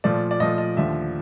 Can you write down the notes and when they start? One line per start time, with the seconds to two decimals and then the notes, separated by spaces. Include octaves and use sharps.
0.04 A#2 F3 A3 D5
0.31 D5
0.40 A#2 F3 A3 D#5
0.58 D#5
0.76 D#2 D3 F3 A3 E5